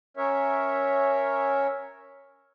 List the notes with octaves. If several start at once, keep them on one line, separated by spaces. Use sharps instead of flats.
C#4 A#4 C#5 E5